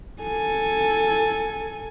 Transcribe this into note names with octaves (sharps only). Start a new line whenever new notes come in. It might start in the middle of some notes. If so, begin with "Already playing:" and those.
A4 G#5